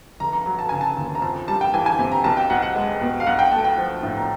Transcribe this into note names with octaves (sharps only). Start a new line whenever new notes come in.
F1 A#5
A#5
F#3 A#5
A5
C#3 G#5
A5
D#2
A#5
F2 A5
G3 A5
G5
E3 G#5
G#5
C3
A#5
B1 A5
G5
B1 F#5
F#5
G#3
B2
F5
B1 F#5
G5
A3 A5
G5
F3
A2
A#5